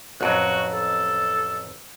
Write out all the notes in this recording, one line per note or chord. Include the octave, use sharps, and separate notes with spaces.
A1 F2 F#3 F#4
A4